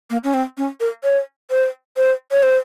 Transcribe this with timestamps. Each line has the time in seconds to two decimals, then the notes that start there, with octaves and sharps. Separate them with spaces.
0.10 A#3
0.24 C#4
0.34 C4
0.57 C#4
0.80 A#4
1.04 C#5
1.50 C5
1.97 C5
2.32 C#5
2.43 C5